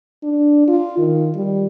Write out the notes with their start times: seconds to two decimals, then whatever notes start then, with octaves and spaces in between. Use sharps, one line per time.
0.23 D4
0.67 F4
0.98 D#3
1.35 G3